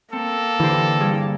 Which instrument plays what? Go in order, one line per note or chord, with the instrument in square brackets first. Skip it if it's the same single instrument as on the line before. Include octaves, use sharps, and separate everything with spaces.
[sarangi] A#3 [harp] C4 [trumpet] A4
[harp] D3 G4 C5 [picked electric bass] E3
[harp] G2 G#4 D6